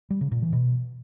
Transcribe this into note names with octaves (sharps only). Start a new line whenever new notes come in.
G3
C#3
A#2
E3
B2